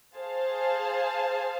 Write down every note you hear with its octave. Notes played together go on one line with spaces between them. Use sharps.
G#4 C5 F5 A5